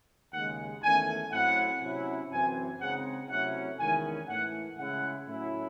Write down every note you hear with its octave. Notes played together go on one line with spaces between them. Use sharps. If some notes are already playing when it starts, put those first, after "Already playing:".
D#2 C#3 G#3 F#5
E2 D#3 A3 C#4 G#5
A2 F#3 C4 E4 F#5
C3 F#3 C#4 E4
F#2 E3 C4 G#5
C#3 G#3 C4 D#4 F#5
C3 F#3 A3 C#4 E4 F#5
E2 D#3 G#3 C#4 E4 G#5
A2 E3 A3 F#5
C#3 G#3 C#4 E4 F#5
A2 F#3 C#4 E4